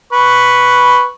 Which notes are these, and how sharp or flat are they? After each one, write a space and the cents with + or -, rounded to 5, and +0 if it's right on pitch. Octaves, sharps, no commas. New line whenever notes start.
B4 +0 C#6 +0